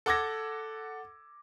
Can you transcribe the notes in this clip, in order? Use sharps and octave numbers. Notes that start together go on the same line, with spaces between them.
A4 F#5 D6 E6 G#6 A#6